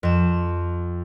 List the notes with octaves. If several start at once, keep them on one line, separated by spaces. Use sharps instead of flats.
F2 E7